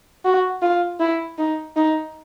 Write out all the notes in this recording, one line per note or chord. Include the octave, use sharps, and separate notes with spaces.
F#4
F4
E4
D#4
D#4